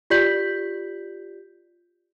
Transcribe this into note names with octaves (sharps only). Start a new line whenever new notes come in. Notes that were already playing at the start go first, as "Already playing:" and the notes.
F4 G4 D5 G6 B6 F#7